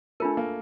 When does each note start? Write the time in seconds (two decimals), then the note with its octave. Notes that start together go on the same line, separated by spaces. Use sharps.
0.20 A3 D4 F4 A#4
0.37 A#3